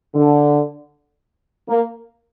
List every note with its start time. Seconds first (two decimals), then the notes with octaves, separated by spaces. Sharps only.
0.14 D3
1.68 A#3